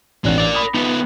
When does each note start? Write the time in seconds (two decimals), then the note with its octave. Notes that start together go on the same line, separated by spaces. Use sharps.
0.24 A1 G#3 C4 D4 F#6
0.38 A#4 D5
0.55 B5 D#6
0.75 F3 B3 D#4